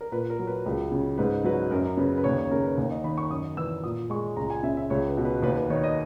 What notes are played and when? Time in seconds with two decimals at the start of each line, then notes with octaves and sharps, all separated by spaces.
0.01 A#4
0.12 A#2 B4
0.30 A#4
0.39 F#3
0.47 B4
0.66 C#2
0.92 C#3
1.18 G#2 B4
1.44 F#3 B4
1.71 F#2 A#4
1.97 C#3 B4
2.18 B4
2.24 D#2 C#5
2.38 C#5
2.51 C#3 A#4
2.64 B4
2.78 D#2
2.91 D#5
3.04 D#3 B5
3.18 C#6
3.30 F#2 D#6
3.57 E3 E6
3.84 A#2 D#6
4.10 G#3 C#6
4.37 C#2 A#5
4.50 G#5
4.63 C#3 E5
4.77 E5
4.90 C#2 C#5
5.08 B4
5.17 B2
5.25 B4
5.43 D#2 B4
5.57 B4
5.70 D#3 C#5
5.84 D#5